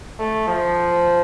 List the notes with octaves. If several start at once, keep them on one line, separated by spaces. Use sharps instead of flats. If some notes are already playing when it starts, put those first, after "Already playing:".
A3
F3